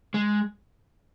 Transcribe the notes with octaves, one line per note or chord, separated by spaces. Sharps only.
G#3